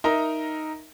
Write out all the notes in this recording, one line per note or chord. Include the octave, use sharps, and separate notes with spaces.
D#4 A#4 D#5 E5 A#5